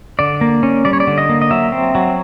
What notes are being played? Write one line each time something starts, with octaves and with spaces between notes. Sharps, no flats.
D3 D5
A#3
C#4
G3 D5
C#5
D5
D3
D#5
A#3
D#5
F#3 E5
C4
F#3